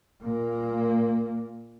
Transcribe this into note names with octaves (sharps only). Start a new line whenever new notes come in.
A#2 A#3